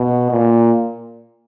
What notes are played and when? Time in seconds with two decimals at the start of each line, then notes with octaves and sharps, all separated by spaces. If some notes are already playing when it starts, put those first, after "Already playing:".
Already playing: B2
0.31 A#2